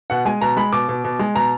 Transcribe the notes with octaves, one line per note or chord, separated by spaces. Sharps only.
B2 F#5
G#3 G#5
B2 A#5
G#3 B5
B2 D6
B2
B2
G#3
B2 A#5